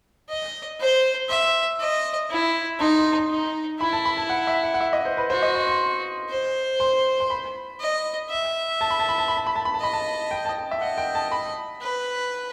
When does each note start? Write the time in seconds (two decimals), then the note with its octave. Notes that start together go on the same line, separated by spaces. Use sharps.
0.29 D#5
0.80 C5
1.29 E5 C6
1.80 D#5
2.30 E4
2.79 D#4 C6
2.99 C6
3.18 C6
3.30 D#4
3.80 E4 B5
3.93 A5
4.05 B5
4.17 A5
4.30 F#5
4.47 E5
4.63 F#5
4.74 F#5
4.81 E5
4.93 D#5
5.05 C5
5.17 B4
5.30 F#4 C5
5.42 D#5
5.56 C6
5.67 C6
6.30 C5
6.80 C6
7.20 C6
7.30 B5
7.80 D#5
8.30 E5
8.81 A5
8.90 B5
8.99 A5
9.09 B5
9.18 A5
9.28 B5
9.37 A5
9.47 B5
9.56 A5
9.65 B5
9.74 A5
9.80 D#5 B5
9.93 A5
10.31 G5
10.45 A5
10.58 G5
10.71 E5
10.81 D#5 F#5
10.98 G5
11.15 A5
11.32 B5
11.81 B4